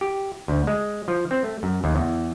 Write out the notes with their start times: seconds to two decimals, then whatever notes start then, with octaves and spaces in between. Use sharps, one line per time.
0.01 G4
0.48 D2
0.67 G#3
1.08 F3
1.31 C4
1.44 A3
1.63 F#2
1.84 D#2
1.96 E2